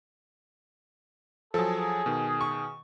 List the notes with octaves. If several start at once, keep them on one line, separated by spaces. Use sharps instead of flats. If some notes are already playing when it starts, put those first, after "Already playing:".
F3 F#3 G#4 A4
B2 D#3
C#6